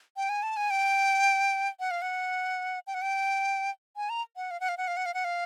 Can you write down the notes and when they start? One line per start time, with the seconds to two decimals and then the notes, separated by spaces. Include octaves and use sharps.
0.17 G5
0.29 G#5
0.43 A5
0.57 G#5
0.70 G5
1.80 F#5
1.91 F5
2.02 F#5
2.87 G5
2.94 F#5
3.02 G5
3.97 G#5
4.10 A#5
4.36 F#5
4.51 F5
4.60 F#5
4.69 F5
4.78 F#5
4.88 F5
4.97 F#5
5.06 F5
5.14 F#5
5.24 F5